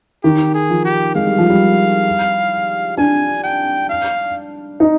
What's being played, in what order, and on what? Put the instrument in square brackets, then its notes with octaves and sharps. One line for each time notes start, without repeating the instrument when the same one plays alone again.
[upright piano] D#3 [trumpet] G4
[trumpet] G#4
[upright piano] F3
[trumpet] G4
[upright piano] G#3 [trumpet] F5
[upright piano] G3
F3
G3
[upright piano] D4 [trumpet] G#5
[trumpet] G5
F5
[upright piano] D#4